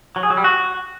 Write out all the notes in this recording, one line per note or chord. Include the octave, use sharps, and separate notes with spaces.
F#3
G#4
F#3
G3
F#4